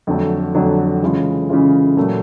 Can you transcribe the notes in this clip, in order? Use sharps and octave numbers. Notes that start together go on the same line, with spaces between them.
F2 D3 F#3 A3
F2 D3 F#3 A3
C#3 E3 G#3 C#4 F4
C#3 E3 G#3 C#4 F4
A#2 F#3 A3